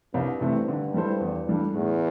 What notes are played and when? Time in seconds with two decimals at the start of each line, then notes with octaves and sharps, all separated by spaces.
0.14 C2 G2
0.41 C3 E3 A3 C4
0.68 D3
0.94 G3 E4 A4 C5
1.21 E2
1.48 E3 G3 D4 A4
1.74 E2 A2